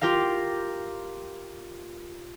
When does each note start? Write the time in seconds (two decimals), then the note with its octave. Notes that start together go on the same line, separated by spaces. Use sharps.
0.01 F4 G4 A#4 F5